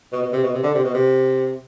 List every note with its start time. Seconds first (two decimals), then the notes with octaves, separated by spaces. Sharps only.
0.12 B2
0.23 B2
0.33 C3
0.43 B2
0.54 C3
0.63 D3
0.74 C3
0.84 B2
0.94 C3